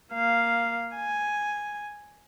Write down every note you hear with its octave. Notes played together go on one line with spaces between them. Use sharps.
A#3 F5
G#5